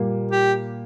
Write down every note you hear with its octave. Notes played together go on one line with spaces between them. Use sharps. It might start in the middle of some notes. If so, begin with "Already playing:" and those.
Already playing: A#2 G3 A#3
G4